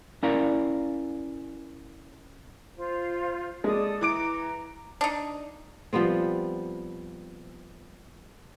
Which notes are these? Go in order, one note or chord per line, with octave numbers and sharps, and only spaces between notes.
C#4 E4 A#4 D5 F5 A#5
F4 C5
G#3 A4 D5 D#6
E3 A#5 D6 D7
D4 D#4
F3 G3 B3 C4